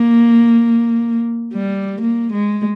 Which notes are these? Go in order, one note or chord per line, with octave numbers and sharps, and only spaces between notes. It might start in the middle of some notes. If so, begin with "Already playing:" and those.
Already playing: A#3
G3
A#3
G#3